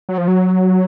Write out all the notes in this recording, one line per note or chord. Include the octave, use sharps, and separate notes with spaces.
F#3
F3
F#3